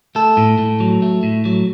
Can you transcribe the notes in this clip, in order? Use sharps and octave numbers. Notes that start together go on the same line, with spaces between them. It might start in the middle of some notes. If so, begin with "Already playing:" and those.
A3 A4
A2
A2
F#3
A3
A2
F#3